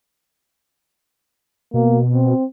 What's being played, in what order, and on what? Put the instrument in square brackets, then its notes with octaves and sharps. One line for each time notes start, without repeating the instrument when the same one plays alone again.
[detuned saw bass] B2 [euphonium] A#3
[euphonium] C4